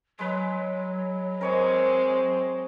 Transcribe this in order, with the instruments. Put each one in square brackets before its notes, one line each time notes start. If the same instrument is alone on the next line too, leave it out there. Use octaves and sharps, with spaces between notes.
[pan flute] F#3 [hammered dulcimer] G#3 B4
[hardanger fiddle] G#3 C4 [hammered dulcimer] A#4 C#5 D#5